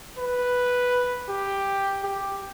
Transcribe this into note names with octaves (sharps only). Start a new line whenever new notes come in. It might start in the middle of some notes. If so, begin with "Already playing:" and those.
B4
G4
G4